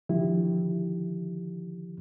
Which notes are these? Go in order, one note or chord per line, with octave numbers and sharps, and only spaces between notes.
D3 D#3 F3 E4 G4